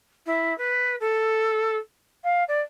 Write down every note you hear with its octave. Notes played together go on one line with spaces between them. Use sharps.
E4
B4
A4
F5
D5